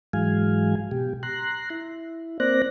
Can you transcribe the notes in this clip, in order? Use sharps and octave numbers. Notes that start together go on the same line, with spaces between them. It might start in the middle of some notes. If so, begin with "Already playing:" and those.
G#2 E3 F#3 G#3 F5 G#5
B2 G4
A#5 C6 F#6
E4
A#3 C4 C5 D5 F#6 A#6